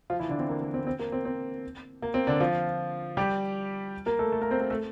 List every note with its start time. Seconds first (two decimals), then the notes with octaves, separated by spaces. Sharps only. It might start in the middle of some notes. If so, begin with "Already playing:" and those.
0.10 F3 F4
0.19 E3 E4
0.29 D3 D4
0.38 C4
0.49 A#3
0.61 A#3
0.74 C4
0.87 C4
0.99 A#3
1.12 C4
1.25 C4
2.02 A#3
2.14 C4
2.27 D3 D4
2.40 F3 F4
3.17 G3 G4
4.06 A#3 A#4
4.19 A3 A4
4.32 A3 A4
4.42 A#3 A#4
4.51 C4 C5
4.60 A#3 A#4
4.70 A3 A4